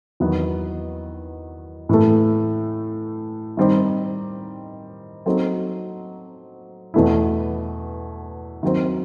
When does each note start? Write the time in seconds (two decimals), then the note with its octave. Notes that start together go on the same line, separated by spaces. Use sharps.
0.20 E2 D#3 F#3 B3
1.89 A2 E3 A3
3.57 D#3 G3 C4 D#4 G4
5.26 F#3 C4 D#4 A4 C5
6.94 E2 B2 A3 E4
8.63 D#3 F#3 C4